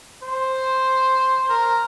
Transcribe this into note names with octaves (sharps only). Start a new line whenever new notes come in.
C5
A#4